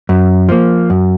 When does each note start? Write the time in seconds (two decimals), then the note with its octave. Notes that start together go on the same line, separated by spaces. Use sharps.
0.09 F#2
0.49 F3 A#3
0.90 F#2